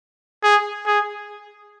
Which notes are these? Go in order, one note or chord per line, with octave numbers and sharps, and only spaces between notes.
G#4
G#4